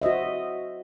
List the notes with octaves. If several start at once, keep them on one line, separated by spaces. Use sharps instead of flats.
F#4 C5 D#5 E5